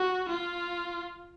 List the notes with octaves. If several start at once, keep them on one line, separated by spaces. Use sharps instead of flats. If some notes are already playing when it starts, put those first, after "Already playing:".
Already playing: F#4
F4